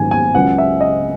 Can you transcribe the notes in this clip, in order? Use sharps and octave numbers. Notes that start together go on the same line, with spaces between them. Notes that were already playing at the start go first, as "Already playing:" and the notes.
Already playing: A#1 G#2 D#3 F#3 C#4 G#5
G#5
C#2 C#3 F#3 F#5
E5
D#5